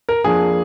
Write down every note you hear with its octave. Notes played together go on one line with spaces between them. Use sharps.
A#4
F2 F3 A#3 D4 G#4